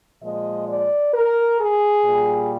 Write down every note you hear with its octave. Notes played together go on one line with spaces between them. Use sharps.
A#2 F3 G#3 D#5
D5
A#4
G#4
A#2 G3